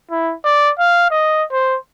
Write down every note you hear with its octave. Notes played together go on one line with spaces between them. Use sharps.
E4
D5
F5
D#5
C5